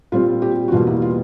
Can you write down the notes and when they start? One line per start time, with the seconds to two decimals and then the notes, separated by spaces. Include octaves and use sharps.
0.12 A#2 G3 C4 F4
0.42 G4
0.68 F#4
0.72 E2 B2 G3 A#3 F4
0.87 E4
1.02 F4